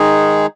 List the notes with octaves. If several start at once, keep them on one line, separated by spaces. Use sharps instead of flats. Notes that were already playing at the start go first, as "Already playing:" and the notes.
Already playing: D#3 G#3 D#4 G#4